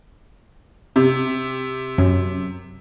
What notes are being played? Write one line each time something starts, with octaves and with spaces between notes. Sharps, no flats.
C3
F#2